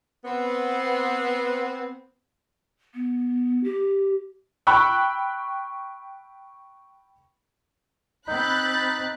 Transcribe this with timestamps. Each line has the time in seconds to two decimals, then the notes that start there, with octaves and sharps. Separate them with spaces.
0.24 B3 C4
2.94 B3
3.63 G4
4.67 G5 B5 C#6 E6 F#6
8.28 C4 D#4 B5 F#6 G6 A6